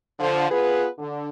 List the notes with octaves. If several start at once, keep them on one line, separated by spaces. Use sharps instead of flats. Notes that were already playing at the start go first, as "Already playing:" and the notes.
D3 F3
B3 F4 G#4 B4
D3